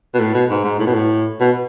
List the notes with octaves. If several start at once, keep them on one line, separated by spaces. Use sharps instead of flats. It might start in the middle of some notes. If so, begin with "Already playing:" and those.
B2
A2
B2
G#2
G#2
A2
B2
A2
B2